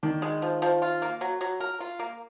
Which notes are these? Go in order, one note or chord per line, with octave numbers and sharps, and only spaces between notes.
D#3 D4
G#3
F3
F3
F4
A#3
F#3
F#3
A#4
F4
A#3